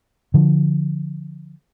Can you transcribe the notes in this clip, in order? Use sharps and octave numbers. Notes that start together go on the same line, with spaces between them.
D3 F3